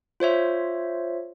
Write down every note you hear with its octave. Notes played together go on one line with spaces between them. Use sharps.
F4 C5 C#5 E5